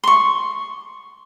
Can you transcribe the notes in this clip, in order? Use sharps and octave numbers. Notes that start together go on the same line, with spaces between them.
C6 C#6